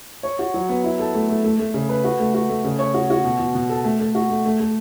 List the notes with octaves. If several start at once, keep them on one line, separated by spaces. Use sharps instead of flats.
C#5
F#4
F#3
B3
E4
A4
A3
A3
A3
A3
C#3
B4
F#4
A3
F#4
A3
C#3
C#5
F#4
F#4
B2
B2
B2
A4
A3
A3
F#4
A3
A3
A3